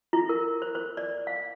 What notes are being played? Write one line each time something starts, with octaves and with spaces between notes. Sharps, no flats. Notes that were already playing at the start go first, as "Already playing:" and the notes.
E4
A#4
C5
C5
D5
F5